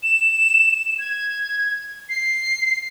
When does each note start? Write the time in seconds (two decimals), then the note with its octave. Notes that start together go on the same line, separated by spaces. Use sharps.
0.03 E7
0.99 G#6
2.09 C7